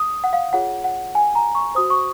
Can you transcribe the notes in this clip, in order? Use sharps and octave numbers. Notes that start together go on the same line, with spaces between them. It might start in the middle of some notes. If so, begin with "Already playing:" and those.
Already playing: D#6
F#5
F5
F4 G#4 C#5 F#5
F#5
G#5
A#5
C#6
F#4 C5 D#6
C#6